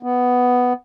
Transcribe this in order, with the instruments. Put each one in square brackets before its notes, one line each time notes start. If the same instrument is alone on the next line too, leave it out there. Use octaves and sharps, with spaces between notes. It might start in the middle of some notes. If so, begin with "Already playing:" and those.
[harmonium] B3